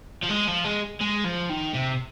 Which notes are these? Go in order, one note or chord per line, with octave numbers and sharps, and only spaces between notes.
F3
G#3
F3
G#3
G#3
F3
D#3
C3